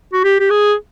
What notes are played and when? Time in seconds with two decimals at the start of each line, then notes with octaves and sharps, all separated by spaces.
0.13 F#4
0.24 G4
0.40 G4
0.50 G#4